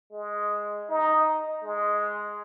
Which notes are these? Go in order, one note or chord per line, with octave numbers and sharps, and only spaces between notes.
G#3
D#4
G#3